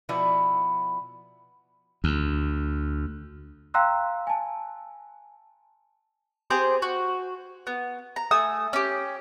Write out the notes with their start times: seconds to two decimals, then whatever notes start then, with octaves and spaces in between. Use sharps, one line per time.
0.09 B2 F3 B3 E4 D5
2.04 D2
3.74 F5 G5 A#5 C6 E6 F#6
4.27 G#5 A5
6.50 C4 G4 G#4 C5
6.82 F#4
7.67 B3
8.16 A#5
8.31 A3 G#5 D#6 E6
8.73 C#4 G4